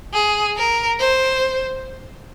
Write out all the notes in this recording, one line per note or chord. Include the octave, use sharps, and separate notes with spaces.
G#4
A#4
C5